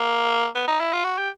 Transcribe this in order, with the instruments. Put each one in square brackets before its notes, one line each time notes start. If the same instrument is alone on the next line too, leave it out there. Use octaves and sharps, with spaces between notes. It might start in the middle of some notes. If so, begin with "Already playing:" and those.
Already playing: [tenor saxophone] A#3
B3
D#4
E4
F4
F#4
G4